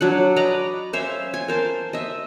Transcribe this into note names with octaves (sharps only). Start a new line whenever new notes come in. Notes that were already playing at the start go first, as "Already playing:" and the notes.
F#3 D4 F#5
B4 D5 D#5 A#5
C#4 C5 E5 F5
G#5
A#4 C5 A5
D#5 E5